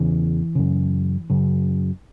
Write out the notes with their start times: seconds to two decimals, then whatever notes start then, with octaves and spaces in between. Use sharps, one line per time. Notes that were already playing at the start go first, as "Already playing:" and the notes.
Already playing: E2 C#3 E3
0.55 F#2 C#3
1.30 F#2 C#3